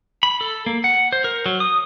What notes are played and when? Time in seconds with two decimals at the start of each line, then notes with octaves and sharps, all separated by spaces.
0.23 B5
0.41 A4
0.66 A#3
0.84 F#5
1.12 C5
1.24 A#4
1.46 F#3
1.60 D#6